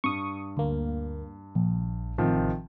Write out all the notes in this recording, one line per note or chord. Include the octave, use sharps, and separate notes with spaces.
G2 C#6 D#6
D2 A#3
A#1
A1 C3 D#3 F3